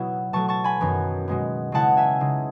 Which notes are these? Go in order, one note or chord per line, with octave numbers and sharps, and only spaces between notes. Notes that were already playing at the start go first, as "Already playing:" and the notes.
Already playing: B2 F#3 B3 E4
B2 F#3 A3 A5 C#6
A5 C#6
G#5 B5
F#2 D#3 F#3 B3
B2 G#3 B3
C#3 G#3 B3 E4 F#5 A5
E5 G#5
C#3 G#3 D#4